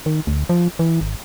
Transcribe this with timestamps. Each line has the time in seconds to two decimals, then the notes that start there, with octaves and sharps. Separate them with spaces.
0.06 D#3
0.27 D2
0.49 F3
0.79 E3
1.01 G#1